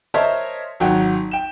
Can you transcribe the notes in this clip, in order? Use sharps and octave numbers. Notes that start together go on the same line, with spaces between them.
A#4 C5 C#5 D#5 E5 A5
G#1 F#3 F#4 G5
G5 E7